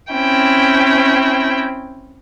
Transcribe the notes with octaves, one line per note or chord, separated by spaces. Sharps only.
C4 C#4 E4 G5